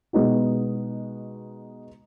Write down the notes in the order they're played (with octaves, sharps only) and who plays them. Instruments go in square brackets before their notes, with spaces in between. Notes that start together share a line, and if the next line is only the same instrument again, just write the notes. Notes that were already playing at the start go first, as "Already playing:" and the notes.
[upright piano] B2 G#3 B3 D#4 F#4